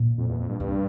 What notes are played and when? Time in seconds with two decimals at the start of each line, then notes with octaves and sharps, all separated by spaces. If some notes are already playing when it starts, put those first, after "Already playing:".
Already playing: A#2
0.18 F2
0.29 E2
0.39 F2
0.49 G2
0.60 G2 C3